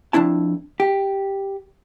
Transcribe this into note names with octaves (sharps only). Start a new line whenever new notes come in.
F2 C4 D4 E4 A5
G4